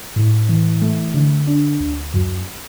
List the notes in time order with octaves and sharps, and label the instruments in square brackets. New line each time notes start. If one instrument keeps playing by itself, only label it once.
[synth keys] A2
E3
A3
D3
D4
D2
F#2